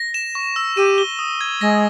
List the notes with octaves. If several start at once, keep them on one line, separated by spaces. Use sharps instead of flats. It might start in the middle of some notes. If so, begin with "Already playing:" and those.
Already playing: A#6
E7
C#6
E6
G4 D#7
G7
D#6
G#6
G#3 A#6